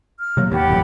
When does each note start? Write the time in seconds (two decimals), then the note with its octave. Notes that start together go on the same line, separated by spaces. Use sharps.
0.18 F6
0.37 C3 F#3 A#3
0.52 D#2 G4 F#5 B5
0.68 D#1 A1 F#2